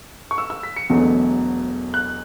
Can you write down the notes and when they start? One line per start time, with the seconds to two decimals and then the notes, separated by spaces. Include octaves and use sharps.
0.31 C#6
0.38 E6
0.50 E6
0.63 B6
0.76 C#7
0.90 E1 E2 B2 F#3 A3
1.94 F#6